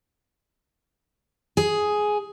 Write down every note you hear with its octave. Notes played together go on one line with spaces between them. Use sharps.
G#4